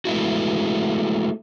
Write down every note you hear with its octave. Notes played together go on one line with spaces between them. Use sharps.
G#3 A3 E4 F#4